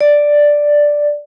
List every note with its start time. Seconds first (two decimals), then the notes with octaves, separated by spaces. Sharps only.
0.01 D5